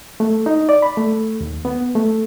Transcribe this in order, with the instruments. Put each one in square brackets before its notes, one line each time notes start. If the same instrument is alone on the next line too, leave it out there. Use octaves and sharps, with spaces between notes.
[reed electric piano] A3
D#4
D5
B5
A3
D#2
B3
A3